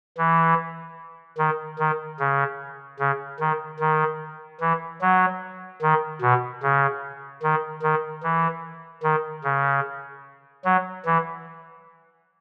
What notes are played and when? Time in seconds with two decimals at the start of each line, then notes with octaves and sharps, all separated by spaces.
0.18 E3
1.38 D#3
1.79 D#3
2.20 C#3
2.99 C#3
3.40 D#3
3.80 D#3
4.61 E3
5.01 F#3
5.82 D#3
6.22 B2
6.63 C#3
7.43 D#3
7.83 D#3
8.23 E3
9.03 D#3
9.44 C#3
10.65 F#3
11.06 E3